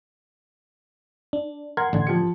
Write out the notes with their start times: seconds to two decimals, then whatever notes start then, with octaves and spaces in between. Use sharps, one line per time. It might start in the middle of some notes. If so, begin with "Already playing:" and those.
1.33 D4
1.77 A#4 F#5 C6 G#6
1.93 A1 D3
2.07 F3 G4 C#7